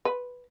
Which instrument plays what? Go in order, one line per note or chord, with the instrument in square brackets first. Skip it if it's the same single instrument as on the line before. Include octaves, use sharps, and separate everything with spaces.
[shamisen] B4